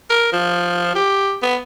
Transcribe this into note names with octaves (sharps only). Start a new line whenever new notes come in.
A#4
F3
G4
B3